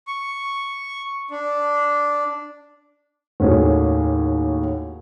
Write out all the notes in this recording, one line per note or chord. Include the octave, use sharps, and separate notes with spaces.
C#6
D4
D#2 A2 D#3 C#4 F#4 G#4